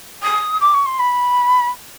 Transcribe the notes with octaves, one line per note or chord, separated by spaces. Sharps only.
D#6
D6
C#6
C6
B5